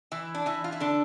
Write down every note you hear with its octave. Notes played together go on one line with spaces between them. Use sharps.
E3 E4
D4
E3 E4
F4
E4
D3 D4